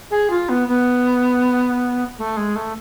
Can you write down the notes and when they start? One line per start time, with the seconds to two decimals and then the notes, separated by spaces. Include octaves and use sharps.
0.11 G#4
0.30 F4
0.49 B3
0.68 B3
2.18 A3
2.37 G#3
2.56 A3